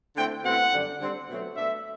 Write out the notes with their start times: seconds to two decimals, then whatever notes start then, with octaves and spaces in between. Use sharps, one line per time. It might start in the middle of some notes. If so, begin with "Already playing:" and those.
0.15 D3 A3 C4 E4 G5
0.44 B2 A3 C4 E4 F#5
0.73 F#2 D3 G3 D4
1.00 D3 G3 C4
1.29 B2 F#3 A3 C4
1.57 B2 A3 D4 E5